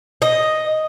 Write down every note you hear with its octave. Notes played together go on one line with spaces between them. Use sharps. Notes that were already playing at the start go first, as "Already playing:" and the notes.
D#5